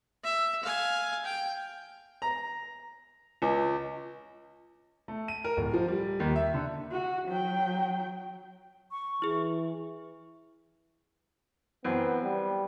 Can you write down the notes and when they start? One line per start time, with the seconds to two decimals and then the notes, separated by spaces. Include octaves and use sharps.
0.24 E5
0.63 F5 G#5
1.25 G5
2.22 A#5
3.42 C#2
5.08 A3
5.28 D#7
5.44 A#4
5.57 D1
5.74 F3
5.88 G3
6.20 D#2
6.36 E5
6.54 D3
6.92 F#4
7.29 F#3 G5
8.91 C#6
9.22 E3 E4 G#4
11.85 F#2 E3 B3 C4
12.22 G3